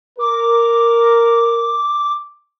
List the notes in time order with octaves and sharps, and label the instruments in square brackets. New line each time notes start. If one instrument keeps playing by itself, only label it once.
[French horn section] A#4 [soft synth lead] D6